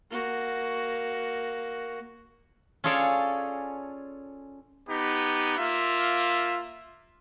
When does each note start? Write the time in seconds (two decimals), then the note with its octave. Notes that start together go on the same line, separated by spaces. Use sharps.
0.10 A#3 F#4
2.84 C#4 F4 G#4 A4 C#5 D5
4.88 B3 D#4 G4
5.58 A#3 F4 E5